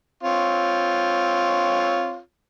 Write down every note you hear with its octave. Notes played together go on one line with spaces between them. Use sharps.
C4 F4 C#5